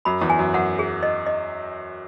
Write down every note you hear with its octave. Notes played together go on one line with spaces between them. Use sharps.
F#2 B5
E2
G#5
F#2
F#2 F#5
G#4
D#5
D#5